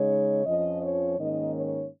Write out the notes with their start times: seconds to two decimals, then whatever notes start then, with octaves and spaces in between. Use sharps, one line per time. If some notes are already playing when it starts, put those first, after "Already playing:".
Already playing: C#3 G#3 D#4 C#5
0.46 F2 F3 C#4 D#5
0.83 C#5
1.18 G#2 D#3 A#3 C#4 D#5
1.54 C#5